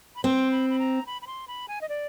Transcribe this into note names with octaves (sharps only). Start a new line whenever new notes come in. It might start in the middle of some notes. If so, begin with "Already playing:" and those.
B5
C4 C6
B5
B5
A#5
B5
B5
C6
B5
G#5
D#5
D5